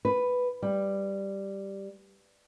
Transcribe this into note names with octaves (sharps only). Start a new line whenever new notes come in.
B4
G3